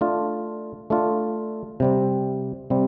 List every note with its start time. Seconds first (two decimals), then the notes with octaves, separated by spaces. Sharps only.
0.01 A3 D4 F4
0.90 A3 D4 F4
1.80 C3 G3 C4
2.70 C3 G3 C4